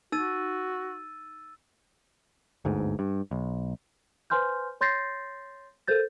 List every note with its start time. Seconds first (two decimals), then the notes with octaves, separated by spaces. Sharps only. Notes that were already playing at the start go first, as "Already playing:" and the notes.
0.12 D#4 F#4 E6 A6 D#7
2.65 G1 D2 G#2
2.99 G2
3.31 B1
4.30 B4 C5 G#5 C6 F6 G6
4.81 C#5 C6 G6 A6 A#6 C7
5.88 A4 A#4 C5 G6 A6